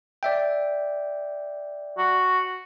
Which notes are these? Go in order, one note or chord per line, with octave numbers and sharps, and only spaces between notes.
D5 E5 G5
F#4